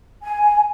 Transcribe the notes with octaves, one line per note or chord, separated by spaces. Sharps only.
G#5